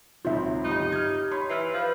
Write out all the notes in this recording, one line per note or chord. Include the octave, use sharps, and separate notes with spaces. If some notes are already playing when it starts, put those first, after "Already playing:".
C#2 D#3 F#3 C4 F4 E5
G1 D#4 G4
F6 G#6
C#5 B5 C6
E3 F6 F#6 C7
F3 B4